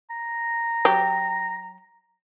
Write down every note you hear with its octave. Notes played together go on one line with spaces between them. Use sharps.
A#5
F#3 G4